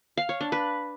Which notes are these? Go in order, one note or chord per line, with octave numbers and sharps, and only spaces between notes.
F5
C#5
D4
B4